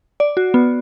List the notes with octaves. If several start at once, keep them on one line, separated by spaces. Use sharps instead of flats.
D5
F#4
B3